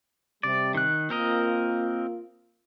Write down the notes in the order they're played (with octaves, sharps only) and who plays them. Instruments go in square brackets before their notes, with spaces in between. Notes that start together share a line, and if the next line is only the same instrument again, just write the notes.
[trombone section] C3 G3 [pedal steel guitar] D5
[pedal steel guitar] D#3 F#6
[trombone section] A#3 F4 [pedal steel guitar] C4 A#4 D#5